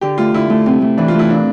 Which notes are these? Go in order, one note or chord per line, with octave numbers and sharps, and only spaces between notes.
D3 G4
A3 F4
D3 E4
A3
C3
A3
E3 D4
F4
A3 E4
A#2 D4